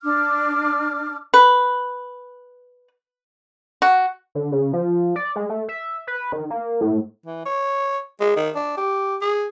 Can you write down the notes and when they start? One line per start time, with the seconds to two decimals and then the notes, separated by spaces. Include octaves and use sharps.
0.03 D4 D6 F6
1.34 B4
3.82 F#4
4.35 D3
4.52 C#3
4.73 F3
5.16 D5
5.36 G#3
5.49 A3
5.69 E5
6.07 B4
6.32 D#3
6.50 A#3
6.81 A2
7.26 E3
7.45 C#5
8.20 G#3
8.36 D#3
8.55 D4
8.77 G4
9.21 G#4